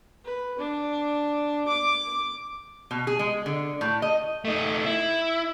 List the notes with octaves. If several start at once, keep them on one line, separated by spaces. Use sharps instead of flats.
B4
D4
D6
B2
G#4
G#3
D3
A2
D#5
A3 D#4
E4